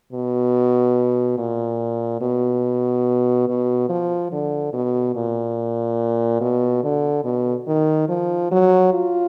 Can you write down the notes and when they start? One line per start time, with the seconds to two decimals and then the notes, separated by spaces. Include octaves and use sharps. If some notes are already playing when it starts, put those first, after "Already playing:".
0.13 B2
1.38 A#2
2.21 B2
3.48 B2
3.89 F3
4.32 D3
4.73 B2
5.15 A#2
6.41 B2
6.84 D3
7.25 B2
7.68 D#3
8.09 F3
8.52 F#3
8.93 F4